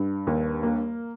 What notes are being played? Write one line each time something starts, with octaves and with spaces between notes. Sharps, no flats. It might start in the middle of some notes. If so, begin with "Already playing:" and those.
Already playing: G2
D#2
A#3